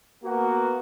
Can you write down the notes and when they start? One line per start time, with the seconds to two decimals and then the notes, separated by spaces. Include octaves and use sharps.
0.24 A#3 B3 F#4